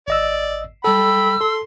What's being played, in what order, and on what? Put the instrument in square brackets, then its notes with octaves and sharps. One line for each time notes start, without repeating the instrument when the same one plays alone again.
[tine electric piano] G#1 D#5 E6 [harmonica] D5
[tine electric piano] G3 A4 [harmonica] G5 B5 [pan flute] E6
[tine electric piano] A4 [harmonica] C6